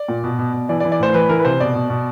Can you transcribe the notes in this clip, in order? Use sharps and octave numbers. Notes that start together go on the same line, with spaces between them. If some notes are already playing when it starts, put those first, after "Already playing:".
Already playing: D5
A#2
B2
B2
B2
E3 D5
D5
E3
D5
A2 C5
C5
E3 B4
E3 A#4
B4
C3 C5
B2 D5
B2
B2